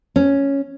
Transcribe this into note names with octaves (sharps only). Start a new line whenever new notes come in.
C#4